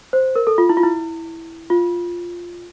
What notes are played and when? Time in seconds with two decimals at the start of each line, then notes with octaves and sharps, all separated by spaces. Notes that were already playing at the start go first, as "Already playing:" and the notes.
0.13 C5
0.35 A#4
0.47 A4
0.58 F4
0.69 E4
0.77 F4
0.83 E4
1.70 F4